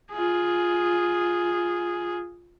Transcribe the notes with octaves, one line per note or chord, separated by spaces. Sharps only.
F4 G#4